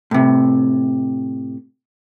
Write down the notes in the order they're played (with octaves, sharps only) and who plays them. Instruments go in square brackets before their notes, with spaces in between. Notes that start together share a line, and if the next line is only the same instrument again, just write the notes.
[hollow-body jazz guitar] A2 C3